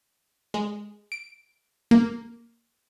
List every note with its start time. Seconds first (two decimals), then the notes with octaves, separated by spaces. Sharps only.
0.54 G#3
1.12 D7
1.91 A#3